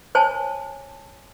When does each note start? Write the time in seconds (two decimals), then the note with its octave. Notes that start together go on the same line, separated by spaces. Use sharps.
0.15 C5 C#5 G#5 A5